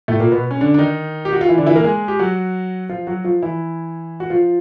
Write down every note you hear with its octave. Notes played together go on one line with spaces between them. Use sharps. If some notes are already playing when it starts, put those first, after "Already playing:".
A2 A3
A#2 A#3
B2 B3
C#4
D3 D4
D4
D#3 D#4
G4
F#4
F4
E3 E4
D3 D4
E3 E4
A#3 A#4
G#3 G#4
G4
F#3 F#4
F3 F4
F#3 F#4
F3 F4
E3 E4
F#4
F3 F4